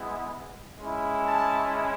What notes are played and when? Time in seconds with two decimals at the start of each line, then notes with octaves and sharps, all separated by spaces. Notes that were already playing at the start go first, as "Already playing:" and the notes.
Already playing: G#3 B3 E4
0.79 G#3 C#4 E4
1.27 A5